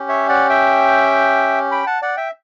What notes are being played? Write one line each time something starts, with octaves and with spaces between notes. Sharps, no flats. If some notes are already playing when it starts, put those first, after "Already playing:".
Already playing: C#4 G4
C#5 E5
D5 F#5
E5 G5
G5 B5
F#5 A5
D5 F#5
E5 G5